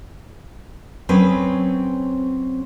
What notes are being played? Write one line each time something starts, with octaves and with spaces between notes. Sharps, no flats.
F#3 C4 C#4 G#4 B4